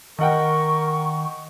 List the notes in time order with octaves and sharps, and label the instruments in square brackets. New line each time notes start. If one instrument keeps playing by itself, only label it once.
[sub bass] D#3 [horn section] A#4 [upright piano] D#5 F#5 G5 [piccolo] C#6